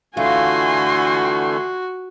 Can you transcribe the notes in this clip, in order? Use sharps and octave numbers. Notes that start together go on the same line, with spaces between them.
D3 E3 A3 F4 F#4 G#5 C6